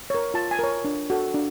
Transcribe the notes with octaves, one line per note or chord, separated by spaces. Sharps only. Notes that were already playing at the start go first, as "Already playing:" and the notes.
A#4 C#5
F4 A5
G#5
A#4 C#5
D4
F#4 A4
D4